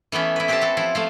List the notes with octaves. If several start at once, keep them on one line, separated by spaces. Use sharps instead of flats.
E3 A3 B3 C#4
E4 B4
C4 G4 B4 C5 G5 A5
F#4 A4
F3 E4
F3 A3 F5